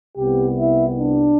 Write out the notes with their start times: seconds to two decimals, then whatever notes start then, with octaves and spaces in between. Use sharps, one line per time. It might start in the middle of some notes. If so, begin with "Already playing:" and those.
0.18 C2 C3 G3 B3 G4
0.58 E4
0.98 D4